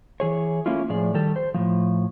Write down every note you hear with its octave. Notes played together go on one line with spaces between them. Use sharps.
E3 G#4 C#5
A3 A#3 C#4 E4 F4
A2 F3 G#4 D5
D#3 G3 A4
C5
A2 F3